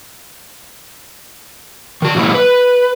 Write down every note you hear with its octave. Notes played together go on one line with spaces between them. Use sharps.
D#3 F#4
E3 F#3 G#3 A#3 E4
B4